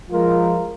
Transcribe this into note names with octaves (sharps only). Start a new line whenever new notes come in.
F3 G#3 F4 A#4